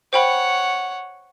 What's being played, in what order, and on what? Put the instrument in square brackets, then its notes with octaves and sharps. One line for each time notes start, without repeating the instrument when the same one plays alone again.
[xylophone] C5 G5 B5 [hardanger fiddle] C#5 F#5